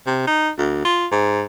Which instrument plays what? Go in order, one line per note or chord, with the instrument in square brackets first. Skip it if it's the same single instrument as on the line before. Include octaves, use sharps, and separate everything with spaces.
[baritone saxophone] C3
D#4
D2
F4
G#2